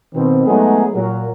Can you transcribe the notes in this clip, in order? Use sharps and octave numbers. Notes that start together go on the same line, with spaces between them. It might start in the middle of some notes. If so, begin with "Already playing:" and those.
B2 D#3 C4
F#3 G#3 A3 B3 D#4 G#4
A#2 F#3 A#4